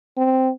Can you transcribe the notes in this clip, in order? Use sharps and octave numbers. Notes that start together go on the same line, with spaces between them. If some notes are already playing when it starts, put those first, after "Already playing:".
C4